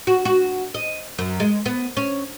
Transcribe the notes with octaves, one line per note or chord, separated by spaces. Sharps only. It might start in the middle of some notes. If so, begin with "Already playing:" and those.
F#4
F#4
D#5
F#2
G#3
B3
C#4